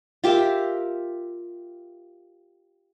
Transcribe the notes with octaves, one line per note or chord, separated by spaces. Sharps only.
F4 G4 A#4 E5